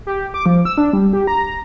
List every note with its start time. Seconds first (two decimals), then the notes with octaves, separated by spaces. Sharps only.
0.07 G4
0.34 D6
0.46 F3
0.65 E6
0.77 D4
0.93 G3
1.13 G4
1.27 A#5